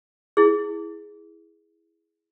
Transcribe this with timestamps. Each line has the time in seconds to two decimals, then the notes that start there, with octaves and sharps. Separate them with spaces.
0.37 E4 G#4